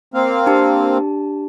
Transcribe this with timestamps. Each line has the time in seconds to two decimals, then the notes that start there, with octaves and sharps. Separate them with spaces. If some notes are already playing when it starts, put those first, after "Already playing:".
0.14 A#3 C4 F5
0.46 D4 G4 A5